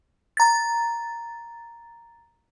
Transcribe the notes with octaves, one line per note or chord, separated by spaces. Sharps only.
A#5 A6